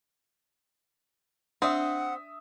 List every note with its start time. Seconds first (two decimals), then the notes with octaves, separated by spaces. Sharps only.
1.62 C4 D4 E5 F#5 D#6